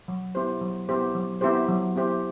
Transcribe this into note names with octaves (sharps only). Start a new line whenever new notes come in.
F#3
B3 E4 G4 C5
F#3
B3 E4 G4 C5
F#3
B3 E4 G4 C5
F#3
B3 E4 G4 C5